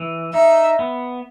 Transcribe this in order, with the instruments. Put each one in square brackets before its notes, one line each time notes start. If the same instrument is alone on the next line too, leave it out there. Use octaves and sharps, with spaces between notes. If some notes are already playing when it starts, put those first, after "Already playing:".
Already playing: [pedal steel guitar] E3
[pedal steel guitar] D#4 [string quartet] E5
[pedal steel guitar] B3